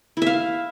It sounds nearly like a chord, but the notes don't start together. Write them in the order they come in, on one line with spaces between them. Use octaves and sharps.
E4 E5 F5